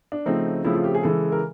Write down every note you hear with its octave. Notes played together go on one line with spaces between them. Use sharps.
D4
C#3 F3 A3 C4 D#4
C#3 F3 A3 C4 E4
F4
G4
G#4
C#3 E3 G#3 A4
A#4